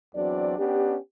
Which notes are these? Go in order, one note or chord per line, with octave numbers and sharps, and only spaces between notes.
E2 F#3 C4 D4 F#4 D5
B3 C#4 D4 G4